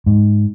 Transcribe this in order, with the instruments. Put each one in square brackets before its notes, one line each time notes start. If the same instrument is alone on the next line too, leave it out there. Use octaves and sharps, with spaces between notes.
[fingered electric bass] G#2